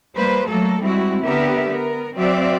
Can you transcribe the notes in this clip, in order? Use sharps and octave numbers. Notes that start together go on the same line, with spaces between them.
G3 A#3 B4 C5
F#3 A3 A#3 A4
G3 G#3 C4 E4 F#4
D3 B3 G4 A#4 E5
B3 A#4
F#3 C4 F#4 D5 E5 F5